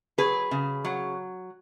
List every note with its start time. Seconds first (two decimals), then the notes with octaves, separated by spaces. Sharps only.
0.18 F#3 G#4 B4
0.51 C#3
0.85 F#3